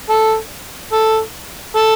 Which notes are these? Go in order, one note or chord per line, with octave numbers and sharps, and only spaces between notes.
A4
A4
A4